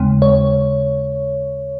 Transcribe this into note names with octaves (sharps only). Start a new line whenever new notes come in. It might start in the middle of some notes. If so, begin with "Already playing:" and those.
Already playing: D#2 C#3 G#3 C4
C#5